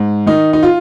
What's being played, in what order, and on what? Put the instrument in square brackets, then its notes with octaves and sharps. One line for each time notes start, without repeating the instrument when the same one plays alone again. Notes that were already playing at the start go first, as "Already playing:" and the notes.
Already playing: [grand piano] G#2
D#3 D#4
D#4
F4